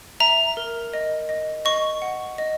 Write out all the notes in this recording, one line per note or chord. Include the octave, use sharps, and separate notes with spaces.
E5 A#5
A#4
D#5
D#5
D#5 C#6
F#5
D#5